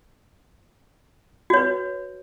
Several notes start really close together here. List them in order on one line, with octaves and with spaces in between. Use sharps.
F#4 C#5 B4